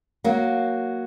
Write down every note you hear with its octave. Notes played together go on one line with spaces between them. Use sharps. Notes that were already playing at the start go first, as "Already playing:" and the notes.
F#3 A#3